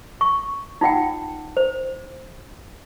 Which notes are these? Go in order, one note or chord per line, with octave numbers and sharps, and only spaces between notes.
C#6
D#4 F4 F#5 G5
C5